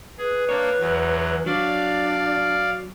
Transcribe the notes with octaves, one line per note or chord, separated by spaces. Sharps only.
G#4 B4
A#3 D4 C#5
E2 F#3
F#3 D4 D5 F5